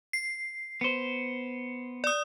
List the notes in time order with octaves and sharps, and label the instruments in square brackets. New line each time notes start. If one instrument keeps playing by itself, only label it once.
[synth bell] C7
[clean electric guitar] B3 C5
[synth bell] D5 D#6